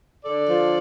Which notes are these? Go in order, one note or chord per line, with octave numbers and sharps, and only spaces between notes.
D3 A4 D5
F3